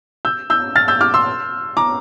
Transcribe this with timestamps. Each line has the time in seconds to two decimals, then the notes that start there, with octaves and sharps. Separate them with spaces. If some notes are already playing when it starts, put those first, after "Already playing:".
0.25 E6 G6
0.50 E6 G6
0.76 F6 A6
0.88 E6 G6
1.01 D6 F6
1.14 C6 E6
1.77 A#5 D6